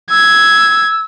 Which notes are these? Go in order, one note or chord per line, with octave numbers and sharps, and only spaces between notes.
E6 G#6